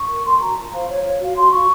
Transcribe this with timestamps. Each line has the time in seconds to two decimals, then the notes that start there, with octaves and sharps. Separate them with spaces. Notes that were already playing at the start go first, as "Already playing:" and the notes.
Already playing: C#6
0.09 A#4
0.24 A#4 C6
0.35 A5
0.40 F#4 A#5
0.56 F4 A5
0.72 C5 F5
0.88 F4 C#5
1.03 F4 C#5
1.20 F#4 F5
1.36 F#4 C6
1.51 F#4 C#6